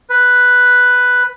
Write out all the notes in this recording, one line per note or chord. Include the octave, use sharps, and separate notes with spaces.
B4